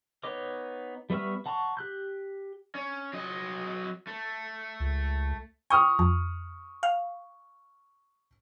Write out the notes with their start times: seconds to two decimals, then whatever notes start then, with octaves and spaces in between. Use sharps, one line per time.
0.23 B3 D#4 C#5 D#5 D6
1.10 G3 B3 E5 C#6 F6
1.46 F#5 A5 A#5 C6 C#6
1.77 G4 F#6 G6
2.75 C#4
3.13 F#3 D#5
4.07 A3
4.80 C#2
5.70 G5 C#6 D#6 F6
5.99 F2
6.83 F5